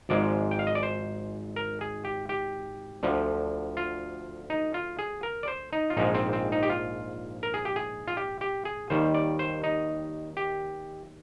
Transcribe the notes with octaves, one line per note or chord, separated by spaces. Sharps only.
G#1 G#2 F3 G#3 D5
G5
F5
D#5
D5
C5
A#4
G#4
G4
G4
D2 D3 F3
F4
D#4
F4
G#4
A#4
D5
C5
D#4
F4
A#1 G#2 F3 G#3 D#4
C4
C4
D#4
G4
F4
A#4
G#4
G4
G#4
F4
G4
G4
G#4
D#2 D#3 G3 C5
D5
C5
D#4
G4